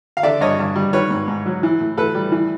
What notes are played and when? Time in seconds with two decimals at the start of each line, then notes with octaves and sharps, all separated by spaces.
0.17 F5
0.23 D3 D5 E5
0.41 G2 C#5 D#5
0.59 G2
0.76 G3
0.93 D#3 B4 C#5
1.11 G#2
1.28 G#2
1.46 F#3
1.63 E3
1.81 A2
1.97 A2 A4 B4
2.14 G3
2.32 E3